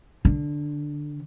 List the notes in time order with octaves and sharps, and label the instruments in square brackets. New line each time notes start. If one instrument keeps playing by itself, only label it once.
[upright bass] D3